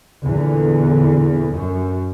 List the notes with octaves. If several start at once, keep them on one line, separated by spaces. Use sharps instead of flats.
E2 A#2 D3
F#2